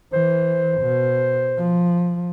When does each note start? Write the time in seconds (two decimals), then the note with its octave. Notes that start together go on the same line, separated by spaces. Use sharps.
0.13 E3 C5
0.81 B2
1.58 F3